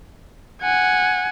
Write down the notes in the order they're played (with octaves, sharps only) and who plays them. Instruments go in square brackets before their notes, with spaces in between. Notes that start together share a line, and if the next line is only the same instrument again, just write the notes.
[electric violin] F#5 G#5